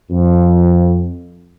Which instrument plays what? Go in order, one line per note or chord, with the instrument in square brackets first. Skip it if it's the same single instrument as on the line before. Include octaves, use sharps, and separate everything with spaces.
[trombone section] F2